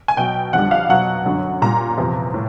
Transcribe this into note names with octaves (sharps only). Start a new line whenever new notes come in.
G#5
B2 F#3 G5
F2 D3 G3 F#5
F5
B2 F#3 F#5
F#2 D3 F#3
A#2 G3 A#5
E2 C3 F3
A2